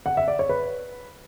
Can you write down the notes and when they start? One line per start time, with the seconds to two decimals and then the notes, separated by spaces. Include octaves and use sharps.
0.06 F#5
0.17 E5
0.28 D5
0.39 C#5
0.49 B4